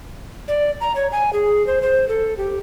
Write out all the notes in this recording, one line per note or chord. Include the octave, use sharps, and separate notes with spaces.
D5
A#5
C#5
G#5
G#4
C5
C5
A4
G4